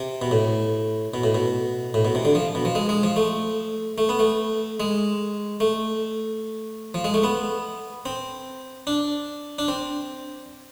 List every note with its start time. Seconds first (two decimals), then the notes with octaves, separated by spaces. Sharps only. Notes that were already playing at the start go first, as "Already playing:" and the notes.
Already playing: C3
0.22 B2
0.31 A2
1.14 B2
1.24 A2
1.35 B2
1.94 A2
2.05 B2
2.15 C3
2.25 D3
2.35 F3
2.55 B2
2.65 F3
2.75 G#3
2.89 G#3
3.03 F3
3.16 A3
3.98 A3
4.09 B3
4.19 A3
4.80 G#3
5.60 A3
6.94 F3
7.04 G#3
7.14 A3
7.24 B3
8.06 C4
8.87 D4
9.59 D4
9.68 C4